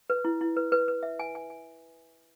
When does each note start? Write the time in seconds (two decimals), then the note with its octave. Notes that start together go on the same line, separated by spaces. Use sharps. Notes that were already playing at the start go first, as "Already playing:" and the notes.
0.10 B4
0.25 E4
0.41 E4
0.57 B4
0.72 B4
0.88 B4
1.03 E5
1.19 G#5
1.35 G#5
1.50 G#5